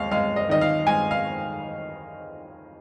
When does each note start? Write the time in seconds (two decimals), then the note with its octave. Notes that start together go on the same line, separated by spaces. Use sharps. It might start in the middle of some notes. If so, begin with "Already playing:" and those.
Already playing: D#2 G#3 F5
0.11 G#3 F5
0.36 D#5
0.49 D#3 D#5
0.61 F5
0.86 G#3 G#5
1.11 F5